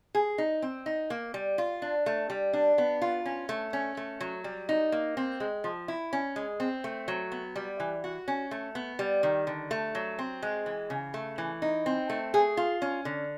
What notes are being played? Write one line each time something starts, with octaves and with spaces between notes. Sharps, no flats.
G#4
D#4
C4
D#4
A#3
G3
F4
D4
A3
G3
D4
B3
F4
C#4
A3
C#4
A3
F#3
G3
D#4
A#3
C4
G#3
F3
E4
C#4
G#3
C4
A3
F#3
B3
G3
E3
F#4
C#4
A3
B3
G3
D#3
D3
A3
F#3
C4
G#3
E3
C#3
A3
E3
D#4
C4
A3
G#4
F4
C#4
D3